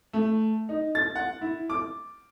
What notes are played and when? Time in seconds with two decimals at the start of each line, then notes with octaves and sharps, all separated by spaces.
0.13 A3
0.69 D#4
0.95 A6
1.15 F#5
1.41 E4
1.70 D6